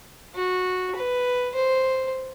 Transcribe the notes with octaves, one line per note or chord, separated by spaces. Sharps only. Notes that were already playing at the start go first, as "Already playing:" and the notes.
F#4
B4
C5